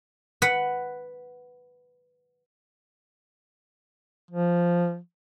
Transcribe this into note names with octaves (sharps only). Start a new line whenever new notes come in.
B4 F#5 B5
F3